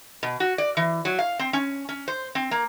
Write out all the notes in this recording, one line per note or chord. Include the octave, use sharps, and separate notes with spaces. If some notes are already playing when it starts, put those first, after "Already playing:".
B2
F#4
D5
E3
F#3
F5
C4
C#4
C#4
C5
C4
A#3